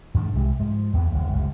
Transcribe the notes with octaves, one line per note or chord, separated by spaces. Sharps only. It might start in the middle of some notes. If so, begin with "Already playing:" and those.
G#2 D#3 F3 D4
C2 C3 G#3
G#2 F3
E2 G2 E3 B3
F#1 D#2
G1 C#2 F#2